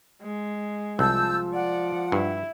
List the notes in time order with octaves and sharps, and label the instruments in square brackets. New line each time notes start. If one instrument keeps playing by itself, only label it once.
[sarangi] G#3
[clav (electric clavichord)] C2 [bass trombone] F3 [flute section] A5 E6 G6
[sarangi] D5 [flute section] F#5
[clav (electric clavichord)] G2 [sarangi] E4